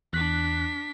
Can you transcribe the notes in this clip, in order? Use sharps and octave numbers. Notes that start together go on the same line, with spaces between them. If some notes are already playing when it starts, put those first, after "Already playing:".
E2 D4 F#6 B6